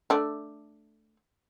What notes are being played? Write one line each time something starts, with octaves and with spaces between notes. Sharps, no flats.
A3 D4